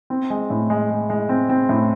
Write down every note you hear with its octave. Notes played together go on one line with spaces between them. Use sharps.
C4
G#3
A2
G#3
G#3
G#3
C4
C4
A2